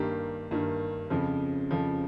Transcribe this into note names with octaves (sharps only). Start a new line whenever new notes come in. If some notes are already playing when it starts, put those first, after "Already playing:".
Already playing: G2 D#3 A#3 G4
G2 D#3 A#3
F2 C#3 F3
F2 C#3 F3